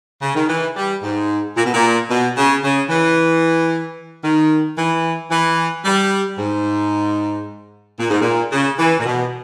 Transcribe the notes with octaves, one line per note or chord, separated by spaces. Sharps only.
C#3
D#3
E3
G3
G#2
A#2
B2
A#2
B2
C#3
C#3
E3
D#3
E3
E3
G3
G#2
A#2
G#2
A#2
C#3
E3
A#2
B2